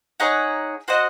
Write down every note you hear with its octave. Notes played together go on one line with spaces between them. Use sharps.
D#4 G#4 C#5 F#5
F#4 C5 D#5 F#5